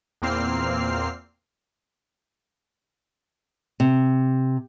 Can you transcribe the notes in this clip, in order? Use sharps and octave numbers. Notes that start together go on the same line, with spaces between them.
E2 A#2 A#3 C4 F6 C7
C3